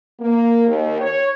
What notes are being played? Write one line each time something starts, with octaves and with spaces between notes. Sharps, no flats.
A#3
D#2
C#5